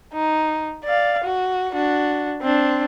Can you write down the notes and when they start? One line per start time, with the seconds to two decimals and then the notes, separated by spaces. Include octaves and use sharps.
0.14 D#4
0.85 D5 F5
1.24 F#4
1.72 D4 F#4
2.41 C4 D4